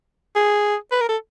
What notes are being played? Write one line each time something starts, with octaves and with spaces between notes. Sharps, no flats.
G#4
B4
A#4
A4